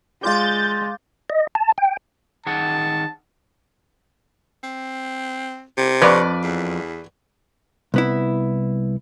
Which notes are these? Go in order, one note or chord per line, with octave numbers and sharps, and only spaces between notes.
G#3 F4 D5 G6 A6
D#5
A5
G5
D#3 G#4 F#5 A5
C4
C3
F2 B4 D5 C#6
E2
C2 B3 E4